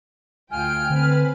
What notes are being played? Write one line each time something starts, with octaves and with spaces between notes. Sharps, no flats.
D2 F4 G5 G#5 F6
D3 C4 B4